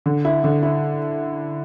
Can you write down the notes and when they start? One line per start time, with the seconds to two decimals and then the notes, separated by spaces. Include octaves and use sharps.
0.06 D3
0.25 E4
0.44 D3
0.63 E4